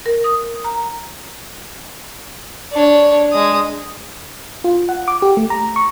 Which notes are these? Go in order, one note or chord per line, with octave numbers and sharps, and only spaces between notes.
A#4
D#6
A#5
D4 C#5
G#3 D#6
F4
F#5
D6
G4
A3
A#5
C#6